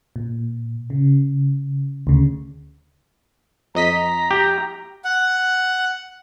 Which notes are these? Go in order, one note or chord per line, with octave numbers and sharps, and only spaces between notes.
A#2
C#3
D2 C#3
F2 D#5 A#5 B6
G4
F#5